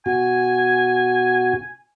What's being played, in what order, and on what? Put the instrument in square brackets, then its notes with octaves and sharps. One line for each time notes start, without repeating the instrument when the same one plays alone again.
[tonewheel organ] B2 F#4 [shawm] G#5